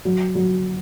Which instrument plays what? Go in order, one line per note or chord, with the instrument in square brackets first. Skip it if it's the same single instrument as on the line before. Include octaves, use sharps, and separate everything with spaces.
[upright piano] F#3
F#3